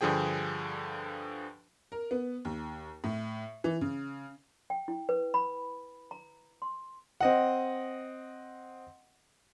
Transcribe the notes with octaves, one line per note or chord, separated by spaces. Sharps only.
G2 D3 F3 G#4 G5
A#4
B3
D#2
A2
E3
C#3
G5
E4
B4
B5
A#5
C6
C4 D#5 F#5